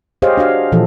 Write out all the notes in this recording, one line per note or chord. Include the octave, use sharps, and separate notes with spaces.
G4 G#4 C5 C#5 D#5 F5
D4 F#4 F5
A#2 E3 F3 A4